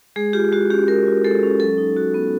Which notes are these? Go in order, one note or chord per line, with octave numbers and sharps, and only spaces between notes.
G#3 G#4
F4 G4
G#3 F#4
C#4 G4
G#3 A#4
F4
G#3 A4
C#4
F#3 A4
D#4
F#4
B3